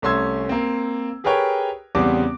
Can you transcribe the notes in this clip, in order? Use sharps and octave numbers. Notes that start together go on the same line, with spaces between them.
C2 A3 C#4 C6 E6 G#6
A#3 C4
G4 G#4 A#4 B4 C#5 G5
E2 C#3 G3 B3 C4 D6